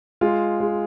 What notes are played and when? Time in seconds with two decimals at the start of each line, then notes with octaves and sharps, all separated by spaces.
0.21 G#3 F4
0.60 G#3